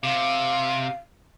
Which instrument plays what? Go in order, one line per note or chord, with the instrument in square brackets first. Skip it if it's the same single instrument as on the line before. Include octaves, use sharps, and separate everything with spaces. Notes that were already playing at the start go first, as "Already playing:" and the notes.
[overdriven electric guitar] C3 [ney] F5